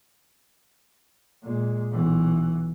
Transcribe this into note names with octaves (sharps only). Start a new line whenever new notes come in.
A#2 G#3
B1 E3